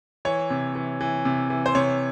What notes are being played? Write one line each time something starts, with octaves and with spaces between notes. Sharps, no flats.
E3 C#5
C3
E3
E3
C3
E3
C5
C3 C#5